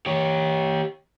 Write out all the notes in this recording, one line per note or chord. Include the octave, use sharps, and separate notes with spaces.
G4 C#5